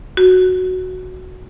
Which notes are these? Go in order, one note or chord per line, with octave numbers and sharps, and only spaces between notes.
F#4